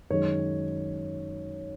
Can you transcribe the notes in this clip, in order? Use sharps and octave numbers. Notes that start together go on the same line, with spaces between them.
F#2 D#3 G#3 C#5